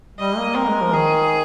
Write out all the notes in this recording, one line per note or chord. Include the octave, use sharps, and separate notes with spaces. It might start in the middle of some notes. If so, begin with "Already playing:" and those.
G3 D#5
A#3
C4 A#4
G#3
F3
D#3 G#4